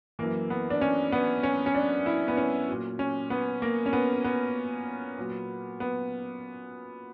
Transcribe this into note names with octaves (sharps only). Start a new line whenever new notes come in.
F#2 E3 A#3
B3
D4
C#4
B3
C#4
C#4
D4
E4
B3
C#4
A#2 F#3
C#4
B3
A#3
C#4
B3
B3
A#2 F#3
B3